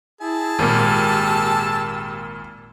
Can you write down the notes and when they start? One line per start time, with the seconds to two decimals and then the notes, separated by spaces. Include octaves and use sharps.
0.21 E4 G#4 A5
0.59 G#1 A#2 G4 E6